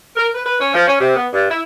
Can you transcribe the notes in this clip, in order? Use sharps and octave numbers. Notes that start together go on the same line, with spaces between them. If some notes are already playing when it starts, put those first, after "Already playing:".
A#4
B4
B4
C#4
F3
C#4
C3
B3
G2
E4